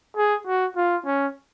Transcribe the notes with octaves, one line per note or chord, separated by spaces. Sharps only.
G#4
F#4
F4
C#4